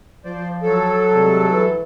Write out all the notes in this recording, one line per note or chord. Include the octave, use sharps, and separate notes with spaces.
F3 C5 D5
F#3 A4
C3 G3 G#3
E3